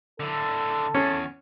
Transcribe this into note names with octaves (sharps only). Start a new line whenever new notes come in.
D3 E4 A4
E2 C#4